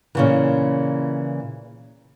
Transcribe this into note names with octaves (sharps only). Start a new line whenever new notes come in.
A#2 C#3 E3